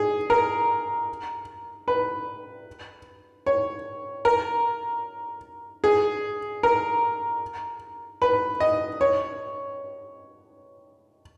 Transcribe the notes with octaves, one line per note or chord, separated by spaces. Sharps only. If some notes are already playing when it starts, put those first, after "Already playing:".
Already playing: G#4
A#4
B4
C#5
A#4
G#4
A#4
B4
D#5
C#5